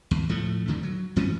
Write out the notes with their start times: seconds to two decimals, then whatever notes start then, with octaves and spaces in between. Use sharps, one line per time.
0.11 D#2
0.29 A2 F3 A3
0.68 E2 D3 D#3
0.83 F#3
1.16 F#2 E3 A3 C#4